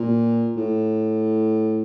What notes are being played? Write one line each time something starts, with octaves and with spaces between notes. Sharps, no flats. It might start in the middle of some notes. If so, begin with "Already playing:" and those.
Already playing: A#2
A2